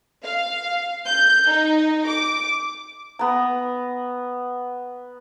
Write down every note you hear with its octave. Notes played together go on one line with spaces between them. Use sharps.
F5
G6
D#4
D6
B3 A#5